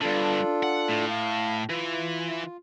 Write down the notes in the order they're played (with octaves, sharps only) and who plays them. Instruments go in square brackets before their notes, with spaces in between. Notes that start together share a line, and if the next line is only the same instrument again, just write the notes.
[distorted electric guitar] G2 D3 [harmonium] D4 F4 A4
[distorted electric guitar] F#5
A2
[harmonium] F5
[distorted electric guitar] E3 [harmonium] F4